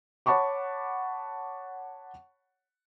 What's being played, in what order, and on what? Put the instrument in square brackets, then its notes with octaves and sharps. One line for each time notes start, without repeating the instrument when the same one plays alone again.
[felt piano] C#5 F#5 A5 B5 C#6 D6